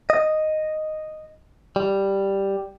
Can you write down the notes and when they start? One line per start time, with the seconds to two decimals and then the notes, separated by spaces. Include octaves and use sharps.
0.10 D#5
1.76 G3